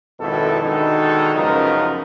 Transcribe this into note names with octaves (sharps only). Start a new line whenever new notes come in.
G#1 F2 B2 D#3 E4 A4
B2 D3 D#3 G#3 D#4 A4
C#2 F#2 F3 B3 D#4 A#4